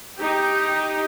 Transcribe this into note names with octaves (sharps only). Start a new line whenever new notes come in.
D#4 G4